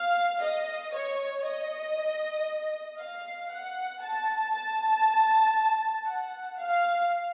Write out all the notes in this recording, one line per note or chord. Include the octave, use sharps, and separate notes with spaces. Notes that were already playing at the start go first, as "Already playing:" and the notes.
Already playing: F5
D#5
C#5
D#5
F5
F#5
A5
A5
F#5
F5